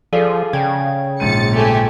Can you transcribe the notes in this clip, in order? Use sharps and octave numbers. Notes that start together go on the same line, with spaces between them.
F3 G#4 A4 D5 F5
C#3 G5 G#6
A#1 G#2 A6 C#7 D#7
A3 G4 G#5